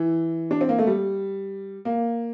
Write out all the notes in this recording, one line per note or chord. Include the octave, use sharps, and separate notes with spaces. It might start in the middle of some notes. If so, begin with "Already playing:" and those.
Already playing: E3
D4
C4
A#3
A3
G3
A#3